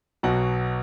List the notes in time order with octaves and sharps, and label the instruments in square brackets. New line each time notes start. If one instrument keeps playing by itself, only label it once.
[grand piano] B1 B2 F#3 F#4 F#5